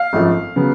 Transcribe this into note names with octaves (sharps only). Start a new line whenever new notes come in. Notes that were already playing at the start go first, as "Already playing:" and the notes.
Already playing: F5
G#1 F#2 F3 A3
C#3 F#3 B3